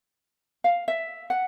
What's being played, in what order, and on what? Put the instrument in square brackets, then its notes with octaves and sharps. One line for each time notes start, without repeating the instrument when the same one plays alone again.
[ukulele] F5
E5
F#5